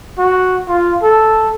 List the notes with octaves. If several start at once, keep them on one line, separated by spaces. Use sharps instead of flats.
F#4
F4
A4